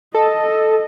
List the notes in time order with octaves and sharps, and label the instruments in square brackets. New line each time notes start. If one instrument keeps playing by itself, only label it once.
[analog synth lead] A4 [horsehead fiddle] D#5